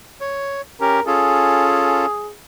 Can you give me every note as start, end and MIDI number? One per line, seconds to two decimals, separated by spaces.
0.21 0.61 73
0.81 1.00 61
0.81 1.00 67
0.81 1.01 70
1.06 2.06 61
1.06 2.06 65
1.06 2.32 68
1.06 2.06 69